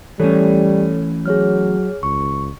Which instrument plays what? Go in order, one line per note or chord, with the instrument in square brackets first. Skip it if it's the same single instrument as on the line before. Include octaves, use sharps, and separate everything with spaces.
[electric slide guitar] E3 A3 C#4 [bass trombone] G3 [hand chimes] A4 C#5
[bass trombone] F#3 [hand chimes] G#4 C#5 F6
[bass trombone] C#2 [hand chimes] C#6